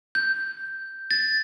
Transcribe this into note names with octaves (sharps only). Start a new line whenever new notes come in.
G6
A6